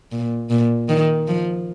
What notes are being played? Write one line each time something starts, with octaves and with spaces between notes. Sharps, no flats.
A#2
A#2
D#3
F3